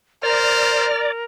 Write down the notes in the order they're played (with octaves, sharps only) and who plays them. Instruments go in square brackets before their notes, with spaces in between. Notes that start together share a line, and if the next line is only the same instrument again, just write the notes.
[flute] A#4 [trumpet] C5 [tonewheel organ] D5 [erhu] F6